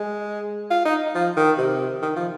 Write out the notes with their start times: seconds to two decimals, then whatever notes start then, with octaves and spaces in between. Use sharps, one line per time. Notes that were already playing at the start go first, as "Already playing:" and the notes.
Already playing: G#3
0.70 F4
0.85 D#4
1.15 F3
1.37 D#3
1.57 C3
2.02 D#3
2.16 F3